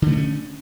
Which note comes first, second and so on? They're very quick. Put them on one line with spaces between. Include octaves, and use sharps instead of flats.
D3 A3 D4 C#4